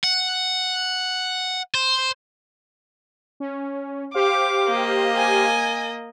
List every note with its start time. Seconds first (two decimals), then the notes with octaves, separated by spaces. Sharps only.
0.04 F#5
1.75 C5
3.40 C#4
4.14 G4 C5 F5 D6
4.67 A#3 D#5
5.17 G#5